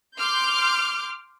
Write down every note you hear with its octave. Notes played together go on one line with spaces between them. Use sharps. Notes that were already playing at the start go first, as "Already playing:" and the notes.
C6 D6 F6 G6